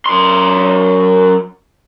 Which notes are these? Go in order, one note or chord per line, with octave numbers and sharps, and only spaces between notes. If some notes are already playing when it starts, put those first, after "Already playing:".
F#2 C6